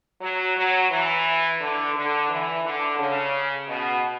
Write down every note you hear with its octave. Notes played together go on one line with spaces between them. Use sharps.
F#3
F#3
E3
D3
D3
E3
D3
C#3
B2